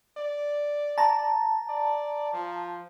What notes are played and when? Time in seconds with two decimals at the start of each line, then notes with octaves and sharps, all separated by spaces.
0.18 D5
0.98 A5 A#5
1.69 D5
2.33 F3